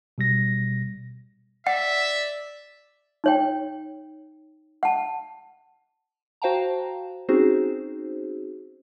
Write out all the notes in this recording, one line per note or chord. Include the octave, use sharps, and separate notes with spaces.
B2 G3 A#6
D5 E5 F#5
D#4 C#5 G5
F#5 A5
F#4 C5 F5 G5 A5 A#5
C4 C#4 D#4 F#4 G#4 C5